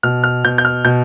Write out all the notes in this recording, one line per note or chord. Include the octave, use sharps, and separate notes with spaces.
B2 F6
F6
B2 G6
G6
F6
B2 G6